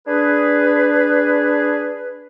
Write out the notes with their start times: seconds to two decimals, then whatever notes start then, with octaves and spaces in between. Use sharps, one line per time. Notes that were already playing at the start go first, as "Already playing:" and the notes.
0.07 D4 G#4 B4